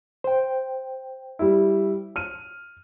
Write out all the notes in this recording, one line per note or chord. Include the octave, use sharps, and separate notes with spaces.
C5 G5
G3 E4
F6 D#7